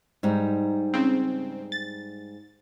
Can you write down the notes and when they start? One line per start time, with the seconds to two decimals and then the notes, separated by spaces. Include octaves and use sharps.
0.23 G#2 G3 D#4
0.94 C#3 C4
1.72 A6